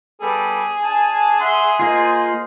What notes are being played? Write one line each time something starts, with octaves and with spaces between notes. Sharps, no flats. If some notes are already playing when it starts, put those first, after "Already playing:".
G3 B3 G#4 A4
D4 G#5 A5
E5 F#5 C6
A#3 F4 C5 D#5